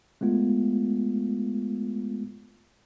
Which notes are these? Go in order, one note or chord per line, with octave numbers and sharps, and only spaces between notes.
G#3 A3 B3 F4